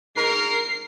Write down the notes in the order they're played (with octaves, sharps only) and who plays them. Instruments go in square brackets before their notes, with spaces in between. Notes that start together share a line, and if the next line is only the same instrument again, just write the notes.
[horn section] G#2 A#4 [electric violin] C7